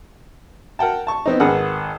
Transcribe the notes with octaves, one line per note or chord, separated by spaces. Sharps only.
A#4 F#5 G5 A5
A5 C#6
B3 C4 D#4
G#1 G#4 A#4 B4 F#5